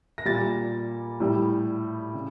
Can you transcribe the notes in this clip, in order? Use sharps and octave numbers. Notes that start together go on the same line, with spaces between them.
A#6
A#2 G3 A6
A2 G3
C#3